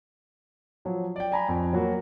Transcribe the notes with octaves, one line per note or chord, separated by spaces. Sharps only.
F3 F#3
D5 G5
G#5 A#5 B5
F2
F#3 A#3 F#4